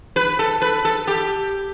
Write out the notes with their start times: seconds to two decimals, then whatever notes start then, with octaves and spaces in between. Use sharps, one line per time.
0.16 B4
0.39 A4
0.62 B4
0.85 A4
1.07 G4